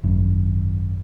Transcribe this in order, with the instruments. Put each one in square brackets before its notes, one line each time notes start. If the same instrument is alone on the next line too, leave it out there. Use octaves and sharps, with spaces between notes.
[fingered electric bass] G#1 F#2